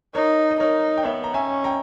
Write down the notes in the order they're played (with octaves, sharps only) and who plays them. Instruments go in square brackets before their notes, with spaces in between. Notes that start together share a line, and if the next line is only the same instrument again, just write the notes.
[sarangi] D#4 [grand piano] A#4 C#5
[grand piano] D#5
[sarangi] D#4 [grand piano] A#4 C#5
[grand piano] G5
[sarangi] B3 [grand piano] C#5 E5
[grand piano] A#5
[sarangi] C#4 [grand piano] E5 G#5
[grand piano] G5 A#5